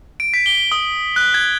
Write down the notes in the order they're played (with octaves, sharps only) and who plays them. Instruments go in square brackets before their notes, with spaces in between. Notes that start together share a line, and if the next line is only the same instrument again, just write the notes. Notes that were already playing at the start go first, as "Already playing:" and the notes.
[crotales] D7
B6
G7
D#6
F#6
G#6